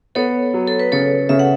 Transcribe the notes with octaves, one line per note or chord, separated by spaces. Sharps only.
B3 A4 C#5
F#3
A4
B4
C#3 A4 C#5
C#3 E5
F#5